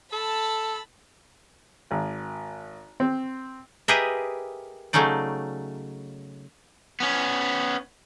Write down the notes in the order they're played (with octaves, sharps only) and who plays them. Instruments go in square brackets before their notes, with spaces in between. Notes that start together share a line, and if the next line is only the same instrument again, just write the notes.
[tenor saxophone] A4 [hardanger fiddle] A5 B5
[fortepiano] G#1
C4
[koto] G4 G#4 A#4 B4 D#5 E5
C#3 F#3 A3 C#4 D#4 D5
[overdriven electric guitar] B3 C#4